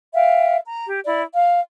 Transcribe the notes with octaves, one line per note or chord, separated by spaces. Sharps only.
E5 F5 G5
A#5
G4
E4 D5
F5